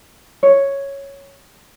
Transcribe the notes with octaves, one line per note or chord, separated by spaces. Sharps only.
C#5